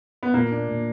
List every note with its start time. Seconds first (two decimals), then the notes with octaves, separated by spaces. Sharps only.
0.23 B3
0.33 A#2 A#3
0.51 D4
0.68 A#2